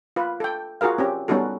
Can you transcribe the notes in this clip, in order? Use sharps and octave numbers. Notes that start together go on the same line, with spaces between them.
F4 B4
A4 G5
F4 F#4 G#4 A#4 F5
C4 C#4 G4
G3 B3 C#4 D#4 F#4 A4